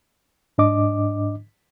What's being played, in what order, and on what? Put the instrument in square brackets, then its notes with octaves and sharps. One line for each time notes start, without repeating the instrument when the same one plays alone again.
[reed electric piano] G#2 D4 D#5 D6